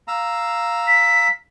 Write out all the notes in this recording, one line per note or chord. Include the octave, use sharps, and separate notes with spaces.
F5 A#5 E6
B6